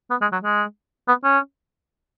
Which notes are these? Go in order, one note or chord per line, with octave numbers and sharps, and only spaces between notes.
B3
G#3
F#3
G#3
B3
C#4